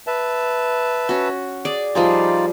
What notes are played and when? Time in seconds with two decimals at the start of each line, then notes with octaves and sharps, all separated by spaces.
0.07 B4 E5 A5
1.09 C#4 F#4
1.65 G#4 D5
1.95 F3 G3 D#4 F4 G#4 D5